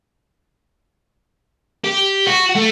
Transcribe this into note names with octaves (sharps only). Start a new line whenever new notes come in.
G4
F#4
A3